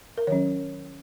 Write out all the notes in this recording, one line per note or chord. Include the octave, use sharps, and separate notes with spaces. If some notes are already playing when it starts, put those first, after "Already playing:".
A#4
D#3 F#3 C#4 C#5